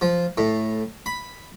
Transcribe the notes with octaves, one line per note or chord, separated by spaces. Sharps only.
F3
A2
B5